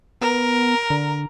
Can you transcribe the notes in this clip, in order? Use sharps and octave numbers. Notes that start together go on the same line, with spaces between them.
B3 A#4
D3